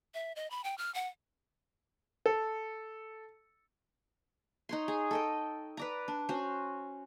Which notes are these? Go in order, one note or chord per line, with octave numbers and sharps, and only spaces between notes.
E5
D#5
B5
G5
F6
F#5
A4
D#4 C#5 C6
G#4
A4 D#5 G5
B4 D5 A#5
D4
C#4 F#4 C5